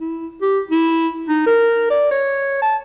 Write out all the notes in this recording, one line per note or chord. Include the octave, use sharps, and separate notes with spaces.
E4
G4
E4
D#4
A#4
D5
C#5
A5